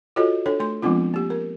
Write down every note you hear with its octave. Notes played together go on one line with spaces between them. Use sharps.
F4 F#4 G#4 A4 C#5 D#5
D4 A4 C#5
A3 C6
F3 G#3 B3 C4 D4 F4
A#3 G4
A#4